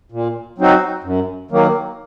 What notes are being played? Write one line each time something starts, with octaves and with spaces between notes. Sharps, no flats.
A#2
F#3 C4 D#4 F#4
F#2
D#3 F#3 A#3